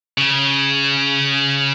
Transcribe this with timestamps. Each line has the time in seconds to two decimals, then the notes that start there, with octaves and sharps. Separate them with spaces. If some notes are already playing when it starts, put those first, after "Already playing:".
0.18 C#3